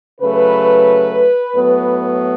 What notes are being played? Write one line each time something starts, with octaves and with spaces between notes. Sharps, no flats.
C#3 F#3 A3 B4
A2 F#3 B3